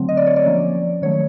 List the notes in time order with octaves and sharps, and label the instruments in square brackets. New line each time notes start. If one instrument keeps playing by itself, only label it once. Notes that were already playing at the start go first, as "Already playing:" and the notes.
Already playing: [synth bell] D3 F#3 A3 C4
D#5
D5
C#5
D5
F3 A#3 C#4
D#3 F#3 A3 C#5